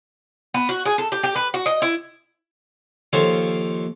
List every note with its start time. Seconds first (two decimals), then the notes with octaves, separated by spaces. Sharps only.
0.54 B3
0.69 F#4
0.86 G#4
0.98 A4
1.12 G4
1.23 G4
1.36 B4
1.54 F#4
1.66 D#5
1.82 E4
3.13 D#2 F3 A4 C5 C#5